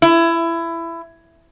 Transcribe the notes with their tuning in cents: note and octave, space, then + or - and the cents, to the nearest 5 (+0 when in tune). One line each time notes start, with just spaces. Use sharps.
E4 +20